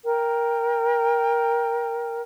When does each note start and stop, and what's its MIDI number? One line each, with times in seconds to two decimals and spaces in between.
0.05 2.22 70
0.05 2.22 79